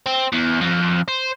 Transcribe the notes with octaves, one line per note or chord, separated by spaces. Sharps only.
C4
E2
F2
C5